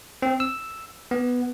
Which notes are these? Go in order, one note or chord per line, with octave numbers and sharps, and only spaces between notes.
C4
E6
B3